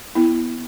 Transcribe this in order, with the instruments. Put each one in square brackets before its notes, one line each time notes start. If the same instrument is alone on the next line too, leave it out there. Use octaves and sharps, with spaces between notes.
[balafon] B3 E4